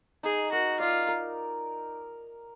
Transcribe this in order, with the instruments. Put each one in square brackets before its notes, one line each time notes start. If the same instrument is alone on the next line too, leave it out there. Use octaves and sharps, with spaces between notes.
[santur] D#4 [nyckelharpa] G#4
[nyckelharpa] F#4 [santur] A#4
[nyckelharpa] F4 [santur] D5
[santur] A#4